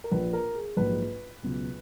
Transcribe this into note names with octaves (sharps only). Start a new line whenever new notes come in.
A#4
A#1 A#2 A#3 B4
A#4
G#4
A#1 G#2 F#3 A#3 B4
C#2 B2 F#3